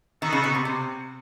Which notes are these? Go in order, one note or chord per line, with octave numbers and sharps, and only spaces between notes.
D#3 B3 D#4 F#4 A4
C#3
B2
C3
C3